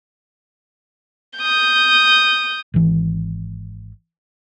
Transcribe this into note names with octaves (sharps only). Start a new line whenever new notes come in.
D#6 G6
G#1 E3